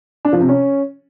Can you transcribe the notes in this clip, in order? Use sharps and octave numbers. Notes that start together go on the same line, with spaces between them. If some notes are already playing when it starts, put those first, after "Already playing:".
D4
F3
C3
C#4